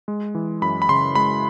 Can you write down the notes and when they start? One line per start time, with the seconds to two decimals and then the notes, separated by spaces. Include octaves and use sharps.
0.08 G#3
0.35 E3
0.62 F#2 B5
0.82 B5
0.89 C#3 C6
1.15 G#3 B5